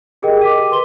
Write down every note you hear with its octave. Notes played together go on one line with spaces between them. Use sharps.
G4 G#4 A#4 D#5 G5
D6 B6 D#7
B4 C6 G7